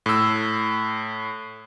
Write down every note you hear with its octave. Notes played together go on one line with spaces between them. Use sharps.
A2 E6